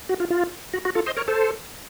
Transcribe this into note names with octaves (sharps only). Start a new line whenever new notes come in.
F#4
F4
F4
F#4
F#4
F4 A4
C5 D#5
A#4 C#5
A4 C5